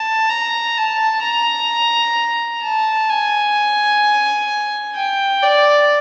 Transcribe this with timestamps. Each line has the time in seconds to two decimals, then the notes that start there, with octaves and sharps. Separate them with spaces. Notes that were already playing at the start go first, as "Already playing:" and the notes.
Already playing: A5
0.30 A#5
0.77 A5
1.23 A#5
2.63 A5
3.10 G#5
4.96 G5
5.43 D5